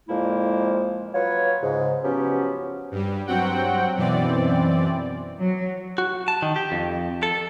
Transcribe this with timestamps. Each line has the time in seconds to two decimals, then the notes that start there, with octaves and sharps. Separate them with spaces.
0.08 F2 A#2 F3 G#3 A#3 E4
1.14 F#3 F4 B4 C#5
1.62 G#2 C#3
2.03 F3 F#3 B3 C#4 F#4 G4
2.91 G2 G3
3.26 G2 F#3 C4 F#4 F#5 G5
3.96 F#2 B2 E3 C4 D5
5.40 F#3
5.98 F#4
6.28 A5
6.42 D#3
6.56 G4
6.72 F2
7.23 A4